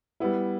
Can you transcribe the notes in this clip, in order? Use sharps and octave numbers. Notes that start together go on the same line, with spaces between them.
G3 B3 E4